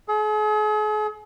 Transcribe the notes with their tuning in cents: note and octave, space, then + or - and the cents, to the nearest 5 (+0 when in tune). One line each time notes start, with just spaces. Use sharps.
G#4 +40